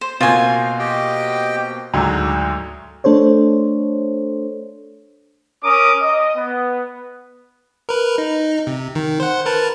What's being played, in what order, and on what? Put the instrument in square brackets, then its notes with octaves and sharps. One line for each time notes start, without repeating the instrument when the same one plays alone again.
[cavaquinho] C5
[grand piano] B2 A#3 C4 [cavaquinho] F4 G#5 [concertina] C5
[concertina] G4 D#5 G5
[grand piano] D2 G#2 F#3 [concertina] D4
[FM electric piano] A3 D4 A4 C5 C#5
[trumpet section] C#4 A#4 D6 D#6
D#5
B3
[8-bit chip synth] A#4 B4
D#4
C3
D#3
C5 F#5
A#4 B4 A5